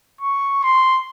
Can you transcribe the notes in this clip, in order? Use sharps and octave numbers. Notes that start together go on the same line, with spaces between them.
C#6
C6